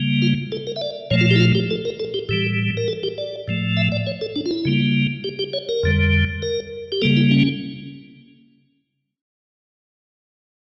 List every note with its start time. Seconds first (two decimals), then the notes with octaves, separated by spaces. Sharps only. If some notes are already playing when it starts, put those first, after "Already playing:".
Already playing: C#3 G3 A#3
0.22 F4
0.52 A4
0.67 A#4
0.76 E5
0.82 D5
1.11 A#2 F3 A3 C#5
1.21 F4
1.31 G4
1.36 E4
1.40 F4
1.55 G4
1.71 A4
1.85 A#4
2.00 A4
2.14 G4
2.29 A2 E3 G3 G4
2.77 A#4
2.88 A4
3.03 G4
3.18 D5
3.48 A2 F3 A3
3.77 E5
3.92 D5
4.07 C#5
4.21 A4
4.36 D4
4.46 F4
4.51 E4
4.65 C#3 G3 A#3
5.24 G4
5.39 G4
5.53 C#5
5.69 A#4
5.83 F2 D3 G3
6.42 A#4
6.92 G4
7.02 C#3 G3 A#3 A4
7.17 E4
7.31 C#4